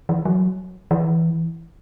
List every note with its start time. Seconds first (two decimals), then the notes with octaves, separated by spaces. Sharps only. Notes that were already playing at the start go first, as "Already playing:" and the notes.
0.09 E3
0.25 F#3
0.91 E3